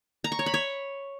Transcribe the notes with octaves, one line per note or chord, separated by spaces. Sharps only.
A#5
C#6
C#5
B5
C#5